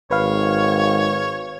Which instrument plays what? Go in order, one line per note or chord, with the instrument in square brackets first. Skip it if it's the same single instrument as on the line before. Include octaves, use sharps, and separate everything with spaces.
[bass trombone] G#1 [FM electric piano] B4 F5 [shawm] C#5